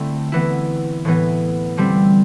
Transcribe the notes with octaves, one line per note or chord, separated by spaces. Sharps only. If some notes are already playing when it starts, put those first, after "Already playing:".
Already playing: D3 A3 C4 E4
E3 B3 E4
A2 E3 B3
D3 G3 C4 E4